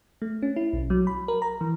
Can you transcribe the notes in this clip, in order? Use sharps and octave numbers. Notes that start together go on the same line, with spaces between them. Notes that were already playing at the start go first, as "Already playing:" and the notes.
A3
C#4
E4
B1
F#3
B5
A#4
A#5
E3